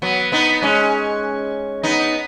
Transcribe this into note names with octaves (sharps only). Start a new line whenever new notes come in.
F#3 B3
B3 D#4
G#3 C#4
B3 D#4